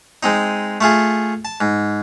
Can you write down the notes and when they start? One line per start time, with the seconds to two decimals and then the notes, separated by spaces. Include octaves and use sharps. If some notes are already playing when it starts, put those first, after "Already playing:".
0.23 G#3 C4 D#4
0.81 A3 F4 G#4
1.45 A5
1.61 G#2